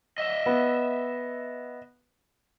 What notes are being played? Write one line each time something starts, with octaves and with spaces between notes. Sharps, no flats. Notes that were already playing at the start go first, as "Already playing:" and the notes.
D#5 E5
B3